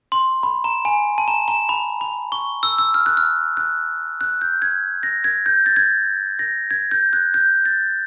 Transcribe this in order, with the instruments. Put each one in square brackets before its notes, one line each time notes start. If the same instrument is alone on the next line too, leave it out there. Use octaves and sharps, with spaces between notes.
[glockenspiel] C6
B5
A#5
G#5
A5
A#5
A#5
B5
B5
C#6
E6
E6
F6
F#6
F6
F#6
F#6
G6
G#6
A#6
G#6
G6
A6
G#6
A#6
G#6
G6
F#6
G6
A6